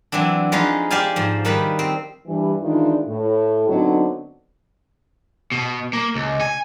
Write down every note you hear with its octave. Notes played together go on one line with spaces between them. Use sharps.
E3 F#3 C4 D4
F3 G#3 D#4 F4 B4 C#5
G4 C5 D5 F5 G#5
G#2 F3
D#3 G3 D#4 B4 B5
C4
G2 E3
D#3 E3 G#3 D4 E4 F4
A2
D3 F#3 B3 C4 D#4 F#4
B2
A#3
C#2
G#5